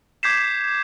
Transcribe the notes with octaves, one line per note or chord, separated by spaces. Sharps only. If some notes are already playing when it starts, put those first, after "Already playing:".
D6 G6 G#6 B6 C7 E7